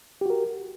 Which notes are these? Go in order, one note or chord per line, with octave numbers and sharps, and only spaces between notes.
F#4 G4 A#4